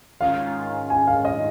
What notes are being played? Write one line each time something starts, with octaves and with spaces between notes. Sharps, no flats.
G#2 D#3 C#4 F4 F5
G#5
F5
D#5